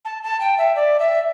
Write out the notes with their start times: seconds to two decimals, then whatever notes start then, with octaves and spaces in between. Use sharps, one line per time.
0.05 A5
0.23 A5
0.41 G5
0.58 E5
0.76 D5
0.99 E5